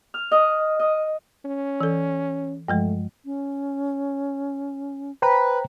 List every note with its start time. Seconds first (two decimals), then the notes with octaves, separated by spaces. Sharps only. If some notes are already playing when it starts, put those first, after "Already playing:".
0.14 F6
0.31 D#5
0.79 D#5
1.45 C#4
1.81 E3 A4
2.68 G2 F3 G#3 A3
3.25 C#4
5.22 B4 C5 G5 A#5